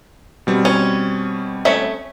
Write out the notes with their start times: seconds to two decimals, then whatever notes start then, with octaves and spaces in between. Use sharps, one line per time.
0.47 B2 G3 C4
0.65 C#4
1.65 A3 C#4 E5